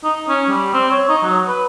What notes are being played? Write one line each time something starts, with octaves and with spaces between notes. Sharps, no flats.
D#4
C#4
G3
C4
C#5
D#4
F#3
B4